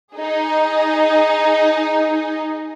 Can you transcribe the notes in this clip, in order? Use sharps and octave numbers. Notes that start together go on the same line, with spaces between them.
D#4 G#4